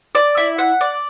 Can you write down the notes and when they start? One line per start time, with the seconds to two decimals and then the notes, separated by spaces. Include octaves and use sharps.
0.15 D5
0.37 E4
0.58 F#5
0.81 D5